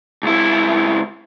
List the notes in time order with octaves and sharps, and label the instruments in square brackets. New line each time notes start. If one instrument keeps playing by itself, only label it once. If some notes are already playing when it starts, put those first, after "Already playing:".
[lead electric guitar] C#2 E4